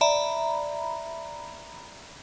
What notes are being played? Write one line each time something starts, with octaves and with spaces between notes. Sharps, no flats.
D5 E5 A#5 B5